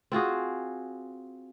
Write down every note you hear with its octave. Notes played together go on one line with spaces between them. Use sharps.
C4 F4 F#4 G#4